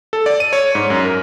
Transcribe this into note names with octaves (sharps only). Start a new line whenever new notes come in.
A4
D5
D#7
C#5
G#2
F#2
A#4